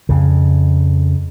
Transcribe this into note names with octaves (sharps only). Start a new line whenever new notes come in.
F2 C#3